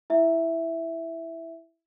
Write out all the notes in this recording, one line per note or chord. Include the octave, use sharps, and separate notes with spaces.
E4 E5